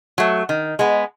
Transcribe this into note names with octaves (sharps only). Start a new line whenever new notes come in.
F#3 A3
D#3
G#3 B3